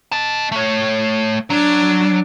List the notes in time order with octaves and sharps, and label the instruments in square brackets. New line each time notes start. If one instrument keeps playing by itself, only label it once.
[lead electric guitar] D#5 A5
A3 C#5
[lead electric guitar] F#3 [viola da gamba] D4